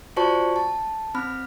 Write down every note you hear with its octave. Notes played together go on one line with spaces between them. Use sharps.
F4 F#4 C5 D5 A5 C#6
A5
C4 B5 F6